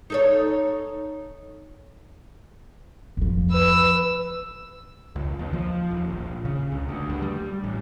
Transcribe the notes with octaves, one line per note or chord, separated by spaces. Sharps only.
D#4 A4 C#5
F2 F3
B4 E6
C#2
D#2
F3
D#1
A#1
C#3
C#2
D2
G2
G3
A1